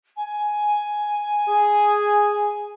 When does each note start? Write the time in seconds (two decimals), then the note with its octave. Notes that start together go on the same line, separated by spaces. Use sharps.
0.16 G#5
1.48 G#4